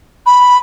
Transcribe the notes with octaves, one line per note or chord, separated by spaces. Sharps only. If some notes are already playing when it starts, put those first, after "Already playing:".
B5